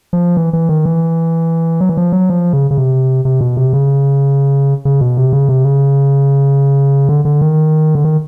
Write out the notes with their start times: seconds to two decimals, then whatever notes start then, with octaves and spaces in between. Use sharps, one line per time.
0.13 F3
0.37 E3
0.53 E3
0.69 D#3
0.85 E3
1.81 F#3
1.89 E3
1.97 F3
2.12 F#3
2.30 F3
2.53 C#3
2.71 C#3
2.78 C3
3.25 C3
3.41 B2
3.57 C3
3.73 C#3
4.85 C#3
5.01 B2
5.17 C3
5.33 C#3
5.49 C3
5.65 C#3
7.09 D3
7.25 D3
7.41 D#3
7.95 D3
8.05 D#3